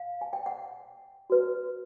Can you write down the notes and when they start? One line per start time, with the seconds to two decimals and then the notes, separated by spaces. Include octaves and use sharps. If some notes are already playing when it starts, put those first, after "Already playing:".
Already playing: F5
0.21 G#5
0.33 G5
0.46 F#5
1.30 F#4 B4